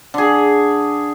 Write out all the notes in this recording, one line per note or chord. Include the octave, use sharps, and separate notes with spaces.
D3 G#4